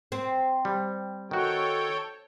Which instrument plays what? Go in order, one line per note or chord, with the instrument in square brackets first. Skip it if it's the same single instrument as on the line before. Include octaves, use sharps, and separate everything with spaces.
[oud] C4
[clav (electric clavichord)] G3
[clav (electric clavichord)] D#3 F#4 [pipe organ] A4 C#5 G5